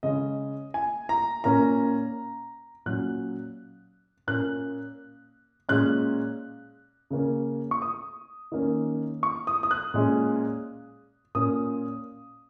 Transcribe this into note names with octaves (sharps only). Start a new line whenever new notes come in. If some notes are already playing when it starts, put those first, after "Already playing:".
C#3 G#3 C#4 D#5
G#5
A#5
A#2 A#3 C#4 A#5
A#2 F#3 C#4 F#6
A#2 A#3 C#4 F#6
A#2 G#3 C#4 F#6
C#3 A#3 C#4
C#6
D#6
D#3 A#3 C#4
C#6
D#6
D#6
F#6
A#2 G#3 C#4
A#2 A#3 C#4 D#6